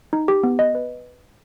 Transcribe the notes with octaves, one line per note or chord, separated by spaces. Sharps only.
D#4
G4
B3
D#5
B4